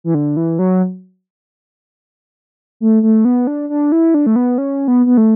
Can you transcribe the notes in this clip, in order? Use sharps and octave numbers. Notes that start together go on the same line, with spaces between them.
E3
D3
E3
F#3
A3
A3
B3
D4
D4
E4
D4
A3
B3
C#4
B3
B3
A3